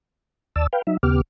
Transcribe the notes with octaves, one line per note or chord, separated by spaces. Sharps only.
D#2 D5 A5 E6
B4 F5 G5
F#3 D#4 E5
D#2 C#3 B3 G4 D6 F6